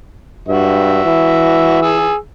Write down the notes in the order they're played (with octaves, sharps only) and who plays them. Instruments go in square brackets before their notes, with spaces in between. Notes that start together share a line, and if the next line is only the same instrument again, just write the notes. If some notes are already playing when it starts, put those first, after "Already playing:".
[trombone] G2 [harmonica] F#4 E5
[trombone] E3
[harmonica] G#4 E6